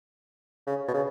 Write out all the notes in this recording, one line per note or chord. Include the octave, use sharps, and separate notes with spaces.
C#3
B2
C#3